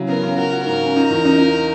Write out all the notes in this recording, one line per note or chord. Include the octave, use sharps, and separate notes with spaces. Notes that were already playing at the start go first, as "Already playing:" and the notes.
Already playing: C#3 F#3 E4
B3 A#4
C#3
F#4 A#4
F#4
G#2 A#4
C#4
D#4
E2
D#4
D#4